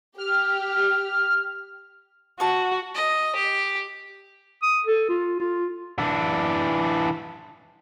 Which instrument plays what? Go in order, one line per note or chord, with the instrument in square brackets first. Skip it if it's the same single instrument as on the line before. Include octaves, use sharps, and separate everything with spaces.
[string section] G4 [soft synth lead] F6
[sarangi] F#4 [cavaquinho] A5 C#6
[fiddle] D#5
G4
[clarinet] D#6
A4
F4
F4
[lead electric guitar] E3 D4